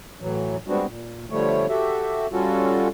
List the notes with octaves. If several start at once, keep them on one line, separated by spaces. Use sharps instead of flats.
A2 E3 F#3
G3 G#3 B3 C4 D4 F#4
A#2
D3 F3 G3 A3 C#5
F#4 G4 A4 E5
G3 C#4 F4 F#4 A4